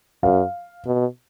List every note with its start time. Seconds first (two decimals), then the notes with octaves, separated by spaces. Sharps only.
0.23 F#2 F5
0.86 B2